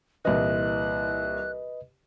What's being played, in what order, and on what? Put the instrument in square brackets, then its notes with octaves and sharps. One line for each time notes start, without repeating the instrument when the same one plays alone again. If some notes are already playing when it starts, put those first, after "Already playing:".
[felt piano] C2 A#2 E3 [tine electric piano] B4 D#5 [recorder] F#6